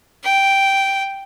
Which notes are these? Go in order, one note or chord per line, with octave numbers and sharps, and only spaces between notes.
G5